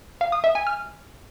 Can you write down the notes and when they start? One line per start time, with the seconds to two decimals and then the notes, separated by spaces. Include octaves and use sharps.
0.21 F5
0.32 D#6
0.44 E5
0.55 G#5
0.67 F6